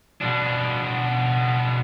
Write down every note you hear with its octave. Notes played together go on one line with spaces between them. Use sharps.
B2 D4